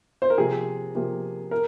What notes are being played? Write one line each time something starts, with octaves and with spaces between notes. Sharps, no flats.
C5
A#4
C3 F3 A#3 G#4
C3 F3 A#3
A#4